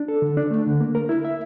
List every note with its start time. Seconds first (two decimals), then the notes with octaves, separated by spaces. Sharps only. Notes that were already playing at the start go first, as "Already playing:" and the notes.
Already playing: D4
0.08 A4
0.22 D3
0.37 D4
0.51 A3
0.67 D3
0.81 A#3
0.95 A#4
1.09 E4
1.25 E5